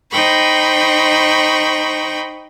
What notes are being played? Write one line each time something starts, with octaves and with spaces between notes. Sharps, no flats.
D#4 C5 G5 B5 C#6